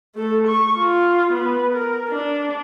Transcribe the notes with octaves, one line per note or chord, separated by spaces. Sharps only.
A3 A4
C#6
F4
B3 B4
A#4
D4